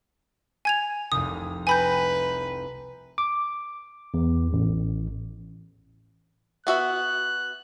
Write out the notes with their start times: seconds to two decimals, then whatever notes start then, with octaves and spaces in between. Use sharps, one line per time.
0.65 G#5 G#6 F7
1.12 F1 C2 D#6
1.67 B4 G5 G#5 A#5 B5 G6
3.18 D6
4.14 E2
4.53 A1
6.67 B3 F#4 E5 F#6